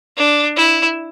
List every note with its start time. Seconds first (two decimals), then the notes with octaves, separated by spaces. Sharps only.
0.17 D4
0.57 E4